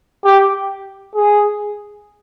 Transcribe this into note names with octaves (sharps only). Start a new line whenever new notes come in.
G4
G#4